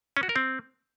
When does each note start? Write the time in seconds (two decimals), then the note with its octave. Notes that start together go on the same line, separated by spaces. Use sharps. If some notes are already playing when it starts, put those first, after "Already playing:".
0.17 C#4
0.23 F#4
0.29 A#4
0.36 C4